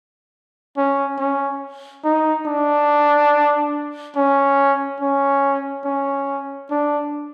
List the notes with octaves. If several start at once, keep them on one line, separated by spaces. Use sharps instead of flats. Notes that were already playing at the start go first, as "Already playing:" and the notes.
C#4
C#4
D#4
D4
C#4
C#4
C#4
D4